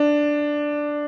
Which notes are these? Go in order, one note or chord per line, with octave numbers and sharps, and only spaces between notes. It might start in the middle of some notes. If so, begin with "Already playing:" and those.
Already playing: D4